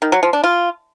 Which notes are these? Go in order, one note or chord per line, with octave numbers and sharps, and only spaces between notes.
D#3
F#3
F3
D4
F4